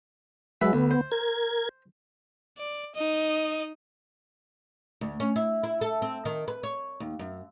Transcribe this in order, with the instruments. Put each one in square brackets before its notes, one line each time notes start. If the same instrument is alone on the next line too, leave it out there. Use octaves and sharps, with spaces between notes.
[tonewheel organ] F#3 G#3 [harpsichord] B4 E5
[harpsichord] D2 [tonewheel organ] B3
[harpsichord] C5
[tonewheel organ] A#4 G#6
[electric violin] D5
D#4 D#5
[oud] D2
C#4
E4
E4
A4
C4
D#3
B4
C#5
D#2
F#2